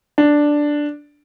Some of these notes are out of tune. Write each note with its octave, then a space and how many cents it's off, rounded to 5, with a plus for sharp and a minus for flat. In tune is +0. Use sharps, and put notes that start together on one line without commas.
D4 +0